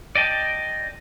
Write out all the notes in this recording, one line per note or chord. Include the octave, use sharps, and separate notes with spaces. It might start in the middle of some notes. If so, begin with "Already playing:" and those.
D5 D#5 G5 A5